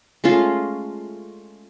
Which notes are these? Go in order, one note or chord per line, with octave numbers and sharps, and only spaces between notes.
G#3 A3 C#4 F4